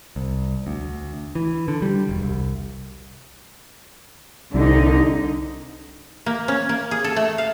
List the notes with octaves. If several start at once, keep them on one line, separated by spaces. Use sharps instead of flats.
C2
D2
E3
D3
G3
E1
C2
C2 D3 D#4
A#3
C#4
A#3
G#4
A4
A3
F5